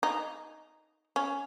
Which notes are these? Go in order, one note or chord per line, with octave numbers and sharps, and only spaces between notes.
D#4
C#4